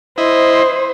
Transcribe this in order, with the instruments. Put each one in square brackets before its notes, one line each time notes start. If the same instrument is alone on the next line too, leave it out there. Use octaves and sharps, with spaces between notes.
[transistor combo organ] E4 D#5 [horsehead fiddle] C5